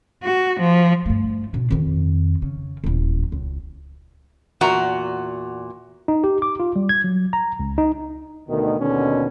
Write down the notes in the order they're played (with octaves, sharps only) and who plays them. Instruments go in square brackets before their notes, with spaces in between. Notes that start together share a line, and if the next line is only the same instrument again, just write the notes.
[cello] F#4
F3
[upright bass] G2 A3
B2 D4
F2 D#3
C#3
D#1 E2
C#2
[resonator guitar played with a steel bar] E2 A#2 F#4 A#5
[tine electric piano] D#4
G4
D6
F4
G3
G#6
F#3
A#5
C#2
D#4
[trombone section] D2 B2 D#3
D#2 B2 D3 D#3 C#4